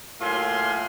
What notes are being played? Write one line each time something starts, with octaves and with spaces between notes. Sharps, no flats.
A2 F#3 A#3 F4 G#5 C6